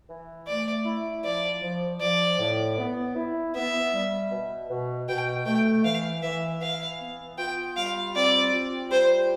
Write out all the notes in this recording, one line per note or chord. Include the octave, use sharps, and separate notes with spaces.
E3
A3 D5
E4
F3 D5
F3
F3 D5
A2
B3
E4
B3 E5
G3
B2
B2
B2 G5
A3 G5
E3 F5
E3 E5
E3 F5
B3
F4 G5
G3 F5
C4 D5
F4
G3 C5